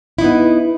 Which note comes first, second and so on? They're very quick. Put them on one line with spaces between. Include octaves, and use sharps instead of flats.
E4 D#4 B3